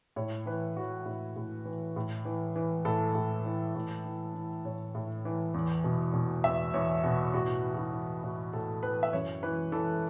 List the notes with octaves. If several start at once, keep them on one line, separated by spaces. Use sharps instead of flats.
A2 C#5
E3 B4
E3 F#4
A2 E4
A2
E3
A2
E3
E3
A2 A4
A2
E3
A2
E3
E3
A2 C#5
A2
E3
E2
B2
B2
E2 E5
E2 C#5
B2 F#4
A2 F#4
E3
F#4
E4
E3
A2 F#4
A2 A4
E3 B4
E5
F#2 C#5
E3 B4
E3 A4